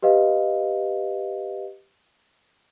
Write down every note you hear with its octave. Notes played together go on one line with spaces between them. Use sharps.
G4 B4 D#5 F5